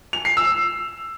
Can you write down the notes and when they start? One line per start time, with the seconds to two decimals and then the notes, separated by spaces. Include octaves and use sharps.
0.13 F7
0.25 C7
0.37 E6